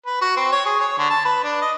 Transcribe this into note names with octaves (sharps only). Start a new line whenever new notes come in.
B4
F#4
C4
C#5
G#4
C#5
D3
A5
B4
D4
D#5